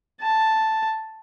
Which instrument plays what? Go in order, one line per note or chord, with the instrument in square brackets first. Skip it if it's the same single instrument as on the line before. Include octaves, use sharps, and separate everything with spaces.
[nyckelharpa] A5